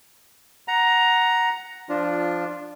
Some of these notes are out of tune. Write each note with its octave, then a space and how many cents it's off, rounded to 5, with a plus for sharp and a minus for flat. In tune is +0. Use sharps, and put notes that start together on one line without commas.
F#5 +0 A#5 +10
F3 -15 D4 +0 F4 +0